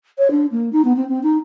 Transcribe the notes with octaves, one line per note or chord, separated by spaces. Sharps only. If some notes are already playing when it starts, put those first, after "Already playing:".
C#5
D4
A#3
D#4
B3
C4
C4
D#4